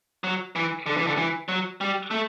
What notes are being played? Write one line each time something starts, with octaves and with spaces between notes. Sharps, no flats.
F#3
E3
D3
E3
D3
E3
F#3
G3
A3